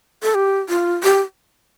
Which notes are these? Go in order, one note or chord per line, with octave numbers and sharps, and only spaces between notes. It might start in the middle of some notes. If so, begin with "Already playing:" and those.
A4
G4
F4
G4